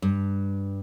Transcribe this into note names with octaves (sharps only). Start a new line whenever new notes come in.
G2